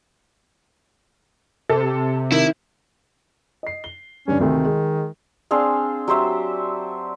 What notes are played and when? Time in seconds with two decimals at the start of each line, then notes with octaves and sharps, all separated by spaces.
1.69 C3 A4
2.32 D#3 E4
3.63 D#5 C7
3.84 G7
4.28 G2 D3 C#4
4.40 D2 C3 D#3 A3
4.64 G#3 G#4
5.51 C4 D4 G#4 F5
6.08 F#3 G4 C5 E5